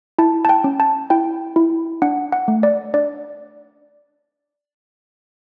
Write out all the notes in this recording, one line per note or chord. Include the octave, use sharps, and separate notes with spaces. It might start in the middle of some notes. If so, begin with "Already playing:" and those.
E4 A5
A5
G5
C#4
A5
E4 G5
E4
D4 F#5
F#5
A3
D5
D4 D5